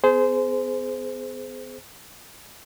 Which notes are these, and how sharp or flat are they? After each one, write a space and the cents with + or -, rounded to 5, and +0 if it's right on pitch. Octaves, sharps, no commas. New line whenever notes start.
B3 +35 G#4 +25 C5 -20